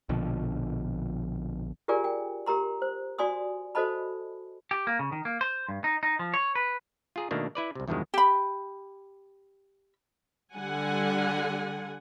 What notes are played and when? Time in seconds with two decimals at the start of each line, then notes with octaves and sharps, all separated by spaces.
0.09 A#1 B2 D3 F3
1.88 F4 G4 G#4 A#4 D5 G#5
2.04 G5
2.46 G4 A#4 A#5 C6
2.82 C5
3.18 F#4 D5 G#5 C6 D#6
3.75 F#4 A4 C5 D#5 A5 B5
4.71 G4
4.87 A#3
4.99 C#3
5.12 D#3
5.25 A#3
5.41 C5
5.69 G2
5.84 D#4
6.03 D#4
6.19 F3
6.34 C#5
6.55 B4
7.16 F4 G#4 A#5
7.31 B2 D#3 A3 A#3 D4 D#4
7.55 E4 B4 D5
7.75 C2 C3
7.88 E2 G2 B2 D#3 F3 G#3
8.14 G4 B5
10.54 D3 G3 F#5 G#5